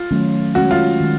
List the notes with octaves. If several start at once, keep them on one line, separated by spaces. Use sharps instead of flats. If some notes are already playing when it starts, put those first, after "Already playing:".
Already playing: F4
D#3 F#3 A3 C#4
D#3 G#3 C#4 F#4
F4
D#3 G#3